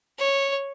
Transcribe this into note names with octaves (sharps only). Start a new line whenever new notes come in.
C#5